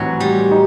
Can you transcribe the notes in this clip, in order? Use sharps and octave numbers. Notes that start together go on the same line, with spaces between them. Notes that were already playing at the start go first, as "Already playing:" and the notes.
Already playing: A2 E3 F#3 C4 D#4
G3
D#4